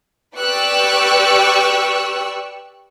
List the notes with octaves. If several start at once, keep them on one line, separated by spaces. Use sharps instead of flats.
G4 B4 D5 C#6 E6 F#6